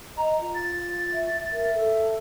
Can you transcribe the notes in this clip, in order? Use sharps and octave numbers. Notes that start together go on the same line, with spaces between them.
D#5 A#5
F4
A6
E5
A#4 E5
A4